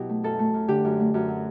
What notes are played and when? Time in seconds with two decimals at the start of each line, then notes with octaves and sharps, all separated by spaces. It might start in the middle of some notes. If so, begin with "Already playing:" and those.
Already playing: B2 F#3 E4 G4
0.09 A3
0.23 F#2 A4
0.39 A3
0.54 F#2
0.68 D3 G4
0.85 F#2
0.99 A3
1.14 F#2
1.28 F#3